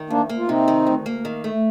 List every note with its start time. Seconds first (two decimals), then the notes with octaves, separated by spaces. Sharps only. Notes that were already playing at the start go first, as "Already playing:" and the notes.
Already playing: D#3
0.10 D2 A#3 D4
0.29 A#3
0.38 F4
0.48 C3 C4 D#4
0.68 D#3
0.87 D2
1.06 A#3
1.25 D#3
1.44 A3